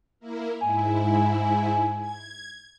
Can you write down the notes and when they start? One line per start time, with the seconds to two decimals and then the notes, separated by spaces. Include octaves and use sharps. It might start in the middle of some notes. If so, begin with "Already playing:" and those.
0.20 A#3 E4 A#4
0.61 G#2 E4 G#5
1.99 G#6